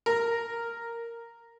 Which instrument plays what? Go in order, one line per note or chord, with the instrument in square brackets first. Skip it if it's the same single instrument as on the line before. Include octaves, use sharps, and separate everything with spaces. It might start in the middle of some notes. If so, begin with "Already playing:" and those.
[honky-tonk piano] A#4